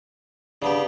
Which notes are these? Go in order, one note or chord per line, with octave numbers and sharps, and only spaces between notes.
C#3 B3 D4 G4